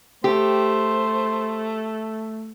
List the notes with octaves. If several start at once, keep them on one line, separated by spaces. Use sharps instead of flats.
A3 G4 C5